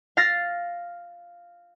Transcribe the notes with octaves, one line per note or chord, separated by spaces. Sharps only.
F5 F6 A6 A#6 C7